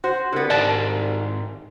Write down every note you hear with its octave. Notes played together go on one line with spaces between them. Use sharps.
F#4 C5
C2 D3 B3
G#2 D#3 D5 A5